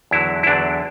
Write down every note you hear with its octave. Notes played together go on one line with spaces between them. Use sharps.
E2 D3 F#3 E4
E4
E2 D3 F#3 D4